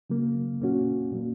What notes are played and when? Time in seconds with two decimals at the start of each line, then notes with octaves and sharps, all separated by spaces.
0.10 C#3 F#3 A#3
0.60 A#2 A#3 C#4 F#4
1.11 A#2 F#3 A#3